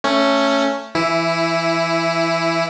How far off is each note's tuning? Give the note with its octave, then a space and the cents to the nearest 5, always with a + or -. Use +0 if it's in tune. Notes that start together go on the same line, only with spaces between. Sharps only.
A3 +15 C#4 +0
E3 +20 E4 +0